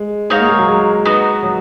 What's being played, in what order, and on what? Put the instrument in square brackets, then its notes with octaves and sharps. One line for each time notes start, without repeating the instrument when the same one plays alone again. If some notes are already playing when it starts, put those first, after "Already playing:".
Already playing: [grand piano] G#3
[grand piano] G#3 [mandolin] D#4 F#4 C#5 F5
[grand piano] A#3
G#3
F#3
G#3
[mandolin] B3 D#4 F#4
[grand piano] F#3